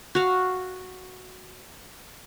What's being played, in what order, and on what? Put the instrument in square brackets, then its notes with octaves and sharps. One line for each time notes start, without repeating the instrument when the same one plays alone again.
[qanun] F#4 F5